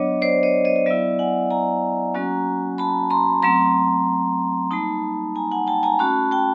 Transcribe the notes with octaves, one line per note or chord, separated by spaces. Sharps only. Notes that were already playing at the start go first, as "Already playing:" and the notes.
Already playing: F#3 B3 D4 C#5 D#5
C5 D5
C#5 D#5
C#5 D#5
D#5
F#3 B3 E4 D5 E5
F#5 G#5
G#5 A#5
F#3 A#3 C#4 F#4
A5 B5
A#5 C6
F#3 A3 C4 A#5 C6
G3 A#3 D#4 A5 B5
G#5 A#5
F#5 G#5
G5 A5
G#5 A#5
A3 C#4 F#4 A5 B5
G5 A5